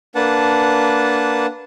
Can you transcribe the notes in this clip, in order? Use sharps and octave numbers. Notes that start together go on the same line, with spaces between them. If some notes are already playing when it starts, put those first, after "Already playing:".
A#3 D4 B4 F#5 A5